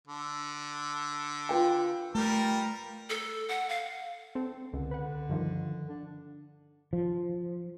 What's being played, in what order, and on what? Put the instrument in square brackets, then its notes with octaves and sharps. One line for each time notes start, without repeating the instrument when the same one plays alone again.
[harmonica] D3
[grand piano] F4 B4 G5
[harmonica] G3 A#4 [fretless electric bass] A3
[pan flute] A4
F#5
F5
[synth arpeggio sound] C4 A4
[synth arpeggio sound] C#2 [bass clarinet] D3
[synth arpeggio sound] B4 F#5
G2 D#3 F3
[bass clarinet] D4
[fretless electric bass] F3